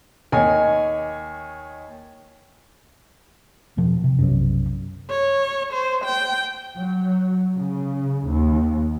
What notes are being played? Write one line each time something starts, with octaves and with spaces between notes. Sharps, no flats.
D#2 C#5 D#5 G#5
E2 B2 F3
C3
B1 F#2
C#5
C5
G5
F#3
C#3
D#2